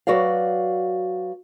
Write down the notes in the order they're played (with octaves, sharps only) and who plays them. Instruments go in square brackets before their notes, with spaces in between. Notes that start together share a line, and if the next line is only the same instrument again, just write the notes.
[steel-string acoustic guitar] F#3 F#4 B4 D5 F5